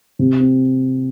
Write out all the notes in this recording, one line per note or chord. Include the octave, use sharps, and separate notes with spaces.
C3
C4